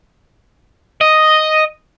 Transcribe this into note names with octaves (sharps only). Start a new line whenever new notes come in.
D#5